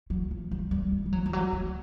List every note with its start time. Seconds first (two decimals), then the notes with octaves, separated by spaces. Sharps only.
0.10 F#3
0.31 F3
0.51 G3
0.71 G3
0.92 G3
1.06 G3
1.13 F#3
1.26 F3
1.33 F#3
1.53 F#3